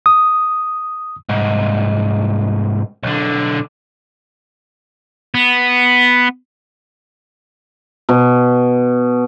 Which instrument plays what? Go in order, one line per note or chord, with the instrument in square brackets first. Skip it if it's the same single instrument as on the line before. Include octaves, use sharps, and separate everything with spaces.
[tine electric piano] D#6
[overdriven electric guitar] C2 G#2
B1 D3
[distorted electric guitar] B3
[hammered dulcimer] B2